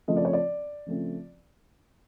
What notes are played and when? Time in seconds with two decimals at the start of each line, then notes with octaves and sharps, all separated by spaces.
0.08 C#3 F3 A3 C4 D#5
0.17 D5
0.25 C#5
0.33 D5
0.86 C#3 F3 A3 C4